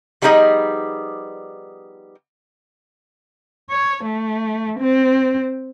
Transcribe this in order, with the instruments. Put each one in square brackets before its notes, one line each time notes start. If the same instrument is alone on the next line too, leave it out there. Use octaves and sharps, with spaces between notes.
[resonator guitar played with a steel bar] F3 G3 B3 D#4 G#4 D#5
[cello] C#5
A3
C4